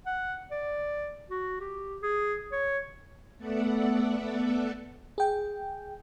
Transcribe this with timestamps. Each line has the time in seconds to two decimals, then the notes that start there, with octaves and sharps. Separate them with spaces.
0.06 F#5
0.51 D5
1.30 F#4
1.60 G4
2.02 G#4
2.52 C#5
3.37 A3 B3 A4 D5 E5 F#5
5.18 G#4 G5